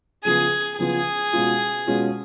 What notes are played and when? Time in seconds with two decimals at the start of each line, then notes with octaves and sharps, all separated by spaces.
0.24 C#3 F3 B3 F4 G#4
0.79 C#3 F3 B3 F4 G#4
1.33 B2 G#3 C#4 F4
1.87 B2 G#3 C#4 F4